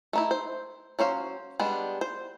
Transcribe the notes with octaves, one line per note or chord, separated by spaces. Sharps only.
A3 D#4 E4
C5
F#3 C#4 C5 F5
G3 G#3 B3 D4
C5